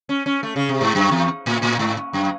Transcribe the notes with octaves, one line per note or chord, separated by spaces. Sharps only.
C#4
C#4
A3
C#3
C3
G#2
F#2
E2
A2
A2
G#2
F#2